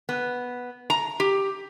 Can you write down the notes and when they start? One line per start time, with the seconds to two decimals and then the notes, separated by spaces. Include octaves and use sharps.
0.09 B3
0.90 A#5
1.20 G4